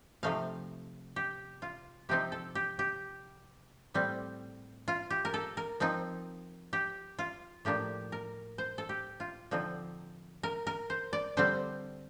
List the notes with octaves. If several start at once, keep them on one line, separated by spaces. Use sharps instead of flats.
C3 F3 A3 D#4 F5
G4
F4
C3 F3 C4 D#4 G4
A4
G4
G4
A2 G3 C4
F4
G4
A#4
A4
A#4
F3 C4 D#4
G4
F4
A2 F3 A#3 D4 G4
A#4
C5
A4
G4
F4
D3 F3 C4 D#4
A#4
A#4
C5
D5
D3 G3 C4 C5